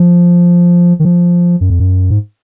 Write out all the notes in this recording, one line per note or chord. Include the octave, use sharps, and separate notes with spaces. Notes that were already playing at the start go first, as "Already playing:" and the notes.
Already playing: F3
D#3
F3
F#2
F2
F#2
G#2